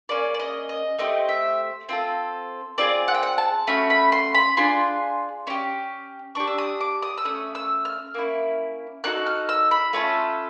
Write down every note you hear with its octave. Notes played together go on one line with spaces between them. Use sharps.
A#3 C#4 G#4 D5
D5
D#5
D#5
A3 C4 G4 D#5
E5
C4 F4 A4
C4 F4 G#4 D5
F#5
G5
F#5
A5
A3 C#4 F#4 B5
B5
C6
B5
D4 F4 G#4 C6
C#4 E4 G4
D4 G4 C#6
E6
D#6
D6
D#6
E6
A3 C#4 D#6
E6
F6
A#3 C#4 E4
A#3 D#4 F#4 A4 F#6
F6
E6
B5
A3 C#4 F4 A4